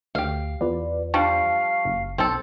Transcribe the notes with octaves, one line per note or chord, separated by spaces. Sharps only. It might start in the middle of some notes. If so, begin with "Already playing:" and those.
D2 G4 F5
E2 F4 B4 D5
F3 G3 D4 F5 A5 C#6
F#1
B1 C4 A4